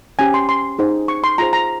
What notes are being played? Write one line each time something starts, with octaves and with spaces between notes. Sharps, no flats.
C#4 G4 C5 G#5
C6
C6
D#4 G#4 C5
C#6
C6
F4 G#4 C5 A#5
A#5